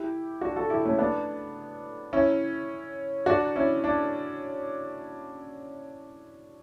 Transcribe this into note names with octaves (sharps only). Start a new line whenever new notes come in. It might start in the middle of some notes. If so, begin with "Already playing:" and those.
Already playing: E4 G4
D4 F#4
F#4 A4
E4 G4
A3 C#4
B3 D4
C#4 E4
D4 F#4
C#4 E4
D4